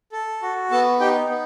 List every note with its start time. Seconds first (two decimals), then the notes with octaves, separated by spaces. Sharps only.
0.12 A4
0.42 F#4
0.71 B3 A4 A5
1.00 D#4 G4 G5
1.29 B3